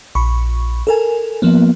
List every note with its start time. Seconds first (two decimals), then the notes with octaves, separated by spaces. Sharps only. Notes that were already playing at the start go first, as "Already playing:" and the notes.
0.15 A#1 B5 C#6
0.87 A4 A#4 G#5
1.42 F3 A#3 B3